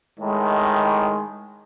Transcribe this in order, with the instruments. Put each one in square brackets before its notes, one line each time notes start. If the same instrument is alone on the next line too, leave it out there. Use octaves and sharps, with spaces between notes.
[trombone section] A2 D#3 [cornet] G#3